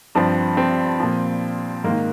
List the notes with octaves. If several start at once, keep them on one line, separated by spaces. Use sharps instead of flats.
G2 F3 C4
C4
A#2 F3
G#2 D#3 A#3